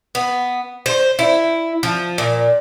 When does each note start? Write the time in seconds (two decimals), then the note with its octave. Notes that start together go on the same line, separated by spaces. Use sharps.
0.15 B3
0.86 C5
1.19 E4
1.83 F3
2.18 A#2